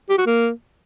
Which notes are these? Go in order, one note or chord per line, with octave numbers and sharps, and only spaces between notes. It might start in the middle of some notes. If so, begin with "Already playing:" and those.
G4
F#4
A#3